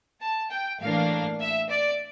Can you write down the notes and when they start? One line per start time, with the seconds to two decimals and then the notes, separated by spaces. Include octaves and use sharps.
0.21 A5
0.51 G5
0.81 A2 E3 A#3 D4 F5
1.40 E5
1.69 D5